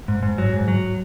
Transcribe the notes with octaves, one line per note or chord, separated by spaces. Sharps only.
G#2
G#2
F#3
G#2
F#3